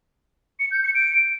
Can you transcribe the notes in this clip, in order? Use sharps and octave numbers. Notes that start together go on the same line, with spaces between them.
C#7
G6
C#7
D7